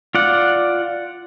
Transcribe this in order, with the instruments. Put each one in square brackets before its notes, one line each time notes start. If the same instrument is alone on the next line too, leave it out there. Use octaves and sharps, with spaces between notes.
[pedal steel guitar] F4 D5 F#5